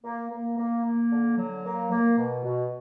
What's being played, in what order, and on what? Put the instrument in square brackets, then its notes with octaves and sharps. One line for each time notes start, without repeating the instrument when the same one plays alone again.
[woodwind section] A#3
A#3
A#3
A#3
D3
F#3
A#3
A#3
B2
B2